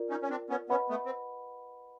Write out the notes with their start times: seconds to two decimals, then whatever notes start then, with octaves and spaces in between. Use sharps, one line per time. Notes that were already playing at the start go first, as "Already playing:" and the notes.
Already playing: F4 A#4 D5
0.10 C#4 D#4
0.22 C#4
0.30 C4 D4
0.50 B3 C#4
0.69 B3 C#4 B4 D#5 F#5 B5
0.89 A3 B3
1.06 C4